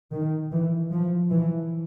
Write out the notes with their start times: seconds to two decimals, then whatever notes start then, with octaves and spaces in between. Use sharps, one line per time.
0.12 D#3
0.52 E3
0.92 F3
1.31 E3